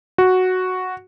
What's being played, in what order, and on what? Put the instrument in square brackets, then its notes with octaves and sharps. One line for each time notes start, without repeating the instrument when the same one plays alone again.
[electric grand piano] F#4